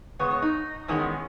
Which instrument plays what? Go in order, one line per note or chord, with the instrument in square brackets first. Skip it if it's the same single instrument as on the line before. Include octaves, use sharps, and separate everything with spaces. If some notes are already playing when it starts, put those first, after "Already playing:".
[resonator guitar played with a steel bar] C#3 G#3 B3 C#5
C#5
D#4
E2 D#3 G#3 B3 C#4